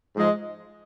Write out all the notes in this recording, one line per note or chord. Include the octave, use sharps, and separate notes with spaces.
G#2 F3 G#3